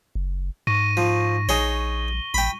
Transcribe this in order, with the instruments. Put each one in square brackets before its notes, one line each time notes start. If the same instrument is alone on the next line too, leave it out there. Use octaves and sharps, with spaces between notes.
[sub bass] F#1
[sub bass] G#2 [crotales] C#6 A#6 D#7
[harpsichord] F3
[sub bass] A#1 [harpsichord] D#4 G#4 C#5 [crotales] G7
[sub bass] A1 [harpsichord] G5 B5